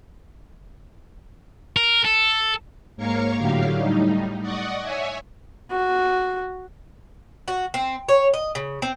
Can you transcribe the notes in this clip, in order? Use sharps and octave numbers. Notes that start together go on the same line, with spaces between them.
A#4
A4
G#2 A#3 A#4 C#5 F5 C#6
A2 D3 F#3 G4 F5
A2 G3 D#4
D5 D#5 F#5 C#6 D#6
C#5 E5 G#5
F#4
F#4
C4
C#5
D#5
C#3
C4